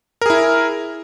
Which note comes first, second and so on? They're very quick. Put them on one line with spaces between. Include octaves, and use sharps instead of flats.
A#4 G#4 E4